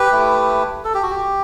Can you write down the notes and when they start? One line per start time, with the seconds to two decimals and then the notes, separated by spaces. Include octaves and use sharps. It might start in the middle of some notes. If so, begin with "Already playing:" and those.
Already playing: G4 B4
0.12 A3 E4
0.85 A4
0.94 G4
1.03 F#4
1.10 G4